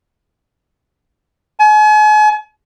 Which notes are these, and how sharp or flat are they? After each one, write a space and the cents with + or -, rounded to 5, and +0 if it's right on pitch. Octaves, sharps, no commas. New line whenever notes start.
G#5 +40